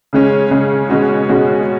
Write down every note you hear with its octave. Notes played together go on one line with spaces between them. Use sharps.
C#3 G#3 C#4
C#3 G#3 C#4
B2 G#3 C#4 F#4
B2 G#3 C#4 F#4